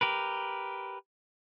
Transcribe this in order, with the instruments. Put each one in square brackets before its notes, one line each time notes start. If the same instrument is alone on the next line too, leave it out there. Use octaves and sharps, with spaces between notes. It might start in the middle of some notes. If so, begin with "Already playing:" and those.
[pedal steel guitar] G4 A#4 B4